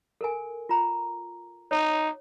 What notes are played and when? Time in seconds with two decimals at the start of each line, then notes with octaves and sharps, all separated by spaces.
0.21 A4 A#4 G#5
0.69 F4 A#5
1.71 D#4 C#5